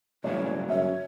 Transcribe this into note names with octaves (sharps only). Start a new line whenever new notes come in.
A1 G2 C#3 F#3 C#5 D5
F#2 C#5 E5